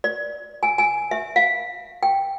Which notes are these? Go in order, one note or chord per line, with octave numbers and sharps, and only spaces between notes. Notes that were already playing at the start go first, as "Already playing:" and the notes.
D5
G#5
G#5
E5
F5
G5